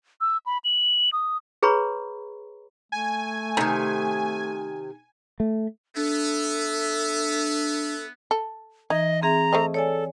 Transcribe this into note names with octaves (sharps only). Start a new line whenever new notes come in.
E6
B5
F#7
D#6
G#4 B4 C#5 A#5 B5 C#6
A3 G#5
C3 D#3 D#4 A4 A#5
A3
B3 D4 A4 E5
A4
E3 D#4 D#5
C4 G#4 E5 A#5
A3 C5 D#5
A4 C#5 D5 G#5